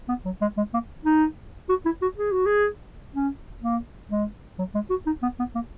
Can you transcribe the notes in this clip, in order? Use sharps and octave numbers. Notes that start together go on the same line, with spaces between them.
B3
F#3
G#3
G#3
A#3
D#4
F#4
E4
F#4
G#4
F#4
G#4
C#4
A#3
G#3
F#3
G#3
F#4
D#4
B3
B3
A#3